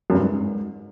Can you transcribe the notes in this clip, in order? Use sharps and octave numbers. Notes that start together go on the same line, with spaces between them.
F#2
G2
G#2